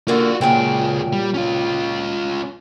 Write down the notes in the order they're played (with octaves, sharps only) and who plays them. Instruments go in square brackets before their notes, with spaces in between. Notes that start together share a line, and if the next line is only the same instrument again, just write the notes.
[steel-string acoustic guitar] D3 A#3 [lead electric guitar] F4 F#4
[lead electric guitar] C#2 G#4 [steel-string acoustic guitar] A#2 F#3 G5
[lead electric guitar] G3
C#4 F4